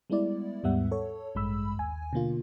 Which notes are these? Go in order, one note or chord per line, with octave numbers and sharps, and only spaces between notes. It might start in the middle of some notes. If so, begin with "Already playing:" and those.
G3 G#3 B3 E4 D5
D#2 G#2 G3 B3 E5 F#5
A4 C#5
A1 G2 G#3 B5 E6
D#2 G#5
B2 D3 A#3 F4